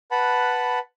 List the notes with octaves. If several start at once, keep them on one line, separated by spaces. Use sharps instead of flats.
B4 F#5 A5 B5